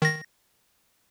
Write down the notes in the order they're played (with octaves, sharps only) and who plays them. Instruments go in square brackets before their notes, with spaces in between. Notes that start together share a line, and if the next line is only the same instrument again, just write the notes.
[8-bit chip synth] D#3 A#6